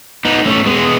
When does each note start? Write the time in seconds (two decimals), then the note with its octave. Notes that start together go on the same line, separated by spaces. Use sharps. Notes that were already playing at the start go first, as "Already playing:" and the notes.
0.25 B3 D#4
0.46 A3 C#4
0.66 G#3 B3